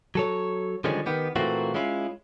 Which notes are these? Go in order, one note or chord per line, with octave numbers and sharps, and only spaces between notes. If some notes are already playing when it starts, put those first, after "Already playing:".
F#3 A4 C#5
D3 D#3 F3 G3 G#3 C#4
D#3 B3 G4
A#2 E3 A3 A#3 C4 F#4
G#3 C#4 E4 F4